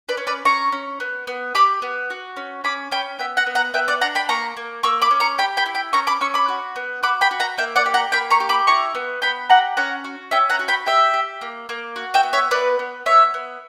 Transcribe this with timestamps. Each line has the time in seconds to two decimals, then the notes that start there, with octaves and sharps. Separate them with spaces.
0.09 B4 D5
0.17 C#4
0.27 B4 D5
0.45 C#4 A#5 C#6
0.72 C#4
1.00 B3
1.27 B3
1.55 G4 B5 D6
1.82 B3
2.10 F#4
2.37 C#4
2.64 C#4 B5 D6
2.91 C#4 G5 B5
3.19 B3 E5 G5
3.37 F#5 A#5
3.46 B3
3.55 F#5 A#5
3.74 B3 E5 G5
3.88 D5 F#5
4.01 D4 F#5 A#5
4.15 G5 B5
4.29 A#3 A#5 C#6
4.57 A#3
4.83 A#3 C#6 E6
5.02 B5 D6
5.11 C#4
5.20 A#5 C#6
5.38 G4 G5 B5
5.57 G5 B5
5.66 E4
5.75 G5 B5
5.93 C#4 A#5 C#6
6.07 B5 D6
6.21 C#4 C#6 E6
6.34 B5 D6
6.48 F#4
6.76 B3
7.03 F#4 B5 D6
7.21 G5 B5
7.31 F#4
7.40 F#5 A#5
7.58 A#3 E5 G5
7.76 D5 F#5
7.86 G4
7.94 F#5 A#5
8.12 A#3 G5 B5
8.30 A#5 C#6
8.40 G4
8.49 B5 D6
8.67 E4 A#5 C#6
8.95 B3
9.22 B3 G5 B5
9.50 G4 F#5 A#5
9.77 C#4 F#5 A#5
10.04 F#4
10.31 C#4 E5 G5
10.50 F#5 A#5
10.59 F#4
10.68 G5 B5
10.86 G4 E5 G5
11.14 G4
11.41 A#3
11.69 A#3
11.96 F#4
12.14 E5 G5
12.23 B3
12.33 C#5 E5
12.51 B3 B4 D5
12.79 B3
13.06 B3 C#5 E5
13.34 B3